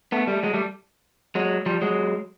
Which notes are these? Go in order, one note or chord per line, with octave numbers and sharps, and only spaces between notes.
A3 B3
G3 A3
F#3 G#3
G3 A3
F#3 G#3
F3 G3
F#3 G#3